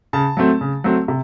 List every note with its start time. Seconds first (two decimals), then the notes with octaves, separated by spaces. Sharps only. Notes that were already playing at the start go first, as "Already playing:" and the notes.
0.13 C#3 A5
0.37 F#3 A3 C4
0.61 C#3
0.84 F#3 A3 C4
1.08 C3